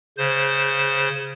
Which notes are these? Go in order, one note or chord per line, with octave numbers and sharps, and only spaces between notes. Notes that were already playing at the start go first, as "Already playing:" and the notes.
C#3 C5